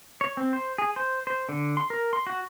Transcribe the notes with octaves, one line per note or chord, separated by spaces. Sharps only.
C#5
C4
C5
G#4
C5
C5
D3
C6
A#4
C6
F#4